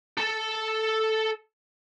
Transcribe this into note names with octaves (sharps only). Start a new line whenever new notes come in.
A4 A5